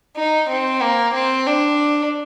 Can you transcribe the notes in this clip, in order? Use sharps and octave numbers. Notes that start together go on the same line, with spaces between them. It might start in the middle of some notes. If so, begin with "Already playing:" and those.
D#4
C4
A#3
C4
D4